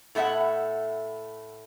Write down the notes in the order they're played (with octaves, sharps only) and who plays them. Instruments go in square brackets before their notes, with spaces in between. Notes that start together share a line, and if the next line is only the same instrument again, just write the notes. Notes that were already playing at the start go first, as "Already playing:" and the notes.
[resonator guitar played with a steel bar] A2 A3 B3 E5 F#5